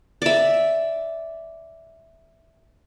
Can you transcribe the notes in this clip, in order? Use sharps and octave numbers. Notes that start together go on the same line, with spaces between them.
D5 E5